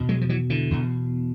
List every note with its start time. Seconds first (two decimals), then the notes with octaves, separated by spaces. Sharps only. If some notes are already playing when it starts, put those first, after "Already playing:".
Already playing: E2 B2
0.09 F#3 G#3
0.21 F3
0.29 E3 F#3
0.50 D3 E3
0.71 E2 B2